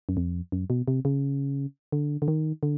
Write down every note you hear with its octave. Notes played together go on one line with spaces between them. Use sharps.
F#2
F2
F#2
B2
C3
C#3
D3
D3
D#3
D3